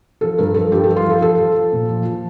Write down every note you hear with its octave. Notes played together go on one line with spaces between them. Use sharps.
F3 A4
G2 A#4
F3 A4
G2 G4
F3 A4
F4
F3 A4
F3 A4
F3
F3
A#2
F3
F3